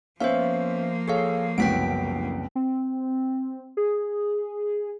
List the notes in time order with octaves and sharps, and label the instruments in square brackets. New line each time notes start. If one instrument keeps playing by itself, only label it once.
[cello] F3 A#3 [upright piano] B3 C#4 E5 [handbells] C5 F5
[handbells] G#4 A4 F5 [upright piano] C#5
[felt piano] F#1 C2 [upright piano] B3 C#4 F#4 [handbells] G5 B6 D7
[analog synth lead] C4
G#4